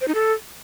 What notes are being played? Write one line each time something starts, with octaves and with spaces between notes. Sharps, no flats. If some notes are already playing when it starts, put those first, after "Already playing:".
C5
D#4
A4